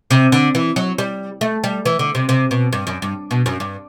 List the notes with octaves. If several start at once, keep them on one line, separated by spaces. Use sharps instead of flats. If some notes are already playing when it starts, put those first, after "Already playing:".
C3
D3
E3
F#3
G3
A3
G3
E3
D3
C3
C3
B2
G2
F#2
G2
B2
F#2
G2